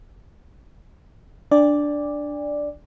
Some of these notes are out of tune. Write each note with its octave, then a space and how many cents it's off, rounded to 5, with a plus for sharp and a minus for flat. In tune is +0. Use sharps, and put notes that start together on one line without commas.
D4 +0 D5 +0 G#5 -45